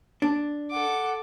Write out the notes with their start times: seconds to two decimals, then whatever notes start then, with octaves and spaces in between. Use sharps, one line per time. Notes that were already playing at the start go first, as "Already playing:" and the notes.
0.22 D4
0.71 A4 F#5 D6